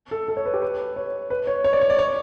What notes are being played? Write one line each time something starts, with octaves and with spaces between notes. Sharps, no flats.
A4
A4
C#5
B4
G4
B4
C#5
B4
C#5
C#5
D5
C#5
D5
C#5